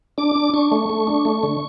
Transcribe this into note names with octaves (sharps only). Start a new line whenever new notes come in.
D4 D6
D4
D4 C#6
A3
A3
D4
A3
D3